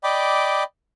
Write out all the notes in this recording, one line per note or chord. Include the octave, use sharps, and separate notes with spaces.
D5 D#5 G5 B5 D6